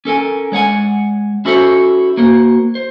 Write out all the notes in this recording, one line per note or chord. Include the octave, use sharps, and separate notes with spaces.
C#4 A4 A#4 G#5
G#3 C#5 F#5 G#5
C#4 E4 F#4 A4 C5 C#5
A#3 F#4 C5
C5